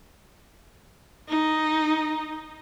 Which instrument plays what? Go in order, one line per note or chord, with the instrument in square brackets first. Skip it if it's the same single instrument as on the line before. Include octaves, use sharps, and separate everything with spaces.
[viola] D#4